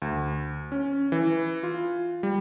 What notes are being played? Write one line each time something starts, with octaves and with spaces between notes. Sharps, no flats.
D2
C#4
E3
F4
G3